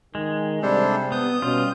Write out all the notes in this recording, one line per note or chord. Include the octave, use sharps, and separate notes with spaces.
D#3 G#3
C3 G3 D4 A4 C5
B3 D#6 G6
B2 G3 C#4 F4